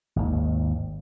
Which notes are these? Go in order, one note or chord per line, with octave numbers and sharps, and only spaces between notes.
G#1 D#2